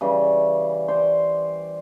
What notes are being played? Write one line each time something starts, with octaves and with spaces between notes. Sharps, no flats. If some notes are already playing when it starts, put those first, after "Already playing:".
C#3 E3 G3
C5 D5